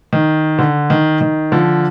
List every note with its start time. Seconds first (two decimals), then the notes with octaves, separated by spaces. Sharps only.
0.13 D#3
0.59 D3
0.90 D#3
1.21 D#3
1.52 D3 F3